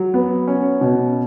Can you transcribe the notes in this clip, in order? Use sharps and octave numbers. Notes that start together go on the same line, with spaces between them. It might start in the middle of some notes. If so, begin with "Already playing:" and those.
Already playing: F#3
B3
C#4
B2